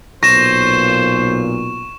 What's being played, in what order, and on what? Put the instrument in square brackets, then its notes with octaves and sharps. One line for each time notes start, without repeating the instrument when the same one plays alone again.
[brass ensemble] B1 A#2 [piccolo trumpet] C5 [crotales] C#6 E7 [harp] A#6